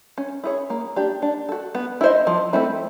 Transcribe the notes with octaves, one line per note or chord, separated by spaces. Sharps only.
C#4
E4 G#4 C#5
A#3
D4 G4
D4
F#4 A4
B3
E4 G#4 C5 D#5
F3
A3 C4 E4